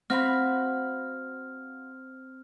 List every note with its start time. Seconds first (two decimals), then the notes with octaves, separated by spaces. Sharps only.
0.10 C4 F#4 F5 B5 F6